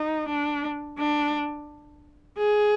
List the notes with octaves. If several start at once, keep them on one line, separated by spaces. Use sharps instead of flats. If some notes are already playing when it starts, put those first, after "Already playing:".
Already playing: D#4
D4
D4
G#4